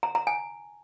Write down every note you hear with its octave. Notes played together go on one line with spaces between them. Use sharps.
A#5
A#5
G#5